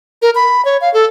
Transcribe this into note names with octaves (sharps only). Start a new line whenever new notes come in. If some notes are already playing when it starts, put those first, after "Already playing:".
A#4
B5
C#5
F5
A4